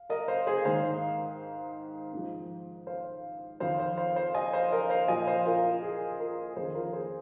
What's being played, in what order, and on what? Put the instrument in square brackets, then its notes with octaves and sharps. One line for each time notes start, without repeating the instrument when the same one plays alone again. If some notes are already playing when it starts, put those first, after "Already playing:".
Already playing: [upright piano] F5
A#4 D#5
C5 F5
G#4 C5
G#2 D#3 C5 F5
G#2 F3
C5 F5
F2 D#3 C5 F5
C5 F5
C5 F5
C5 F5
D#5 G#5
C5 F5
A#4 D#5
C5 F5
A#2 F3 D#5 G#5
C5 F5
F4 A#4
F4
G#4
F4 A#4
F2 D#3 G#4 C5
F4 A#4
G#4 C5